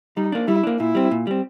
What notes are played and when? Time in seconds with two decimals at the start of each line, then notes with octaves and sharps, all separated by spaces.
0.17 G3 D#4
0.32 A#3 D4
0.48 G3 E4
0.63 A#3 D4
0.79 A#2 E4
0.95 G3 C4
1.11 A#2
1.27 G3 C4